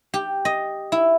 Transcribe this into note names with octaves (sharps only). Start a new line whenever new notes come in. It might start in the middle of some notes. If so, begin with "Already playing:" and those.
G4
D#5
E4